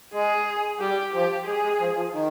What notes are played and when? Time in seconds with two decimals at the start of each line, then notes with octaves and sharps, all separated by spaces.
0.13 G#3 G#4
0.80 G3 G4
1.13 F3 G4
1.46 G#3 G#4
1.63 G#3
1.80 F3
1.96 F3
2.13 D#3